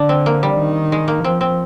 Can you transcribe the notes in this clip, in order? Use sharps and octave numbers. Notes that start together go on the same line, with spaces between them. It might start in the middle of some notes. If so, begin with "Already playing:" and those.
Already playing: D3 D4
C4
A#3
G3
D#3
G#3
A#3
F3 C4
C4